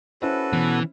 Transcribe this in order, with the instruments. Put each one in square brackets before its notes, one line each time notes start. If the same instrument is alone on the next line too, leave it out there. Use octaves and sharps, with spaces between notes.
[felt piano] C#4 E4 C5 [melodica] F#4 A4 B4
[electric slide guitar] B2 B3 [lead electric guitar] E3